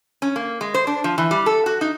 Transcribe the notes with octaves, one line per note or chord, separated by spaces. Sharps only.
C#4
A#3
G#3
C5
D4
F3
E3
G3
A4
F#4
D#4